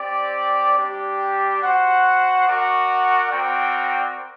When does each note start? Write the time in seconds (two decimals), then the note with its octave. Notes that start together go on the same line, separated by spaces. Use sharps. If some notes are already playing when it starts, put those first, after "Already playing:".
Already playing: C4 G4 D5
0.76 G3 D4 G4
1.61 F#4 C5 F#5
2.46 F#4 A#4 D5 F#5
3.30 C4 F#4 A#4 D5 G5